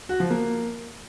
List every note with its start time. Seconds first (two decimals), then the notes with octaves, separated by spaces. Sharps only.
0.09 F#4
0.20 F3
0.30 A#3